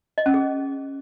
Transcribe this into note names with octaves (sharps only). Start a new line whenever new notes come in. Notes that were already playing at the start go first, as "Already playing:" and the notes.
D#5
C#4
G#4